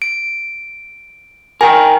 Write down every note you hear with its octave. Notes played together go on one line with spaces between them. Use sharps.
D7
A#4 G5 G#5